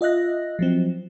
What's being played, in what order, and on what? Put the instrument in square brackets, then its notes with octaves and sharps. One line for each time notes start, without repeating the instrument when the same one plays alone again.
[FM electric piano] F4 D#5 E5 F#6 A#6
F3 F#3 C4